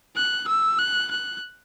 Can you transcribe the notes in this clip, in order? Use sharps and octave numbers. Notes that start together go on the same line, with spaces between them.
F#6
E6
F#6
F#6